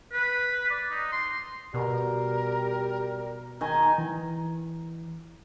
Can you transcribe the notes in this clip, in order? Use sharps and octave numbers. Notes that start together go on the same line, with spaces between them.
B4
D5
D#4
C6
B2 G3 A#4
D#3 D#5 G#5
E3